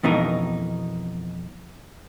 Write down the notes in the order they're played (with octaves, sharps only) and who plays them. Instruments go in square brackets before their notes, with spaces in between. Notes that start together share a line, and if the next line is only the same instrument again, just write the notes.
[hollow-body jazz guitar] F2 B2 E3 D#4 A#4